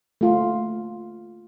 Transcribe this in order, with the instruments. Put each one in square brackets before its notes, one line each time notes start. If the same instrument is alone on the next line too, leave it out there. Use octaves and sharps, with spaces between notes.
[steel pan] A3 F4